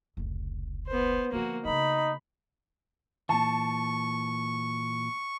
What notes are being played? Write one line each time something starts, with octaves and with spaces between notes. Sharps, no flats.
F1 C#2
B3 C5
D3 F3 A#3 F#4
C#3 D4 D#4 B5
A#2 E3 A5 C#6